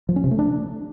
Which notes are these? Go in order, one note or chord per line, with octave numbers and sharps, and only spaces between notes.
F3
C#4
C3
A3
D4